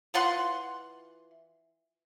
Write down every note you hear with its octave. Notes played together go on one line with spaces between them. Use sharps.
E3 F4 F#5 C6